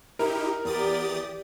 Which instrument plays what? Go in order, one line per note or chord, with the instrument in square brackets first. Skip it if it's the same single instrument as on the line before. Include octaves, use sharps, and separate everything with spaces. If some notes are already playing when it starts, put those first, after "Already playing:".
[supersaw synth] D#4 E4 G4 [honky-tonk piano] A#4
[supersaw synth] E2 D#6 A6 [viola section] G4 D5